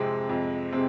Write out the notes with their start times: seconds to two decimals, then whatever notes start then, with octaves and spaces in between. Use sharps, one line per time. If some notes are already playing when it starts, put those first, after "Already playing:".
Already playing: F2 C3 G#3 C4
0.29 F2
0.73 C3 G#3 C4